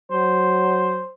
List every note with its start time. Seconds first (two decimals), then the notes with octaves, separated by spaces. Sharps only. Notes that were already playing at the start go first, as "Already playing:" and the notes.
0.12 F#3 C5